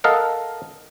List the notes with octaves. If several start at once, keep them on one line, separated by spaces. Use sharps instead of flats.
A4 A#4 D#5 F5 F#5